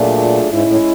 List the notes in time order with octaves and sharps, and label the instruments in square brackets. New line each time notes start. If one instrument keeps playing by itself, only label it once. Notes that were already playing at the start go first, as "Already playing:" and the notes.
Already playing: [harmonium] A#2 [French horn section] F#3 A3 D4 F4 G#4
[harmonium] G#2 [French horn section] G#3 C#4 E4
[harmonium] A2